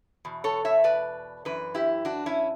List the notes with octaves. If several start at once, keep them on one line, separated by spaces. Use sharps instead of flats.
E2 B2
A4 C#5
C#5 E5
B4 D5
F#2 E3 B4
E4 G4
D4 F#4
C#4 E4